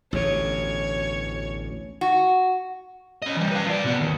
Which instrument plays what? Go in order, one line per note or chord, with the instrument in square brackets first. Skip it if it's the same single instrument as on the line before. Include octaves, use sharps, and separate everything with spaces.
[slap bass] A1 D2 B2 [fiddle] C#5
[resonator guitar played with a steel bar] F#4
[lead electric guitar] C#4 D#5
E3 G3
B4 F5
F3 D5
C3 B3
D#2